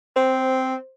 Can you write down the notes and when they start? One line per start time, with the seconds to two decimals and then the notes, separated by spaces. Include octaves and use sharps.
0.16 C4 C5